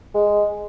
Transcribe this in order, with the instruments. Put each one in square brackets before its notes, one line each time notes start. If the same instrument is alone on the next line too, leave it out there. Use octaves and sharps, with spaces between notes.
[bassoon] G#3